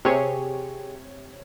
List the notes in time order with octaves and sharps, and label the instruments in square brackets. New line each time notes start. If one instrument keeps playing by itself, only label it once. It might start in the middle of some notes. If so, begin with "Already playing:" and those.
[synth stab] C3 C#5 [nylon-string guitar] G4 G#4